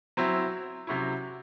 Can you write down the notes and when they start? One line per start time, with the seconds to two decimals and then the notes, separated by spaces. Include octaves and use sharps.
0.17 F#3 C4 E4
0.87 C3 F#3 C#4 E4